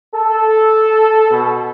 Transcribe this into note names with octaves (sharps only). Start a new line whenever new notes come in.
A4
B2